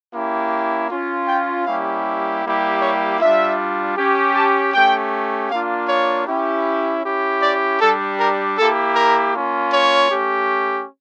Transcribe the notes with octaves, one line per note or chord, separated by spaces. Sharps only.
A#3 C#4 E4 G4
C#4 F4
G5
G3 A#3 C#4 E4 G4 F5
G3 A#3 E4 G4
C#5
G3 D4 F4 E5
C#4 G4
A5
A3 C#4 G4 G5
A#3 D4 F4 F5
C#5
C#4 E4 G4
C#4 E4 G4
D5
G3 D4 G4 A4
A#4
A#3 E4 G4 A4
A#4
A#3 C#4 F4
C#5
A3 C#4 G4